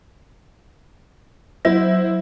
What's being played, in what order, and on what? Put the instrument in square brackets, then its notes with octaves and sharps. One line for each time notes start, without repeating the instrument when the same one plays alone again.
[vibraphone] F#3 [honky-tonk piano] E4 C5